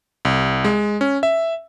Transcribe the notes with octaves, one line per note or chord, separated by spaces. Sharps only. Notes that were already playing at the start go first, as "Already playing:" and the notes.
C2
G#3
C#4
E5